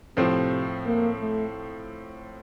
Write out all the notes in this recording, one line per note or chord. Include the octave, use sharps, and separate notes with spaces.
A2 C3 F3 C4
A#3
A3